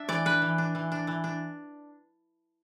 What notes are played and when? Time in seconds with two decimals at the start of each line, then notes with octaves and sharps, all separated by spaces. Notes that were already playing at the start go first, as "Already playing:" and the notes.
Already playing: D4 E5
0.09 E3 D5
0.25 D4 B4
0.42 E3
0.58 D4
0.75 E3
0.92 D4
1.07 E3
1.24 D4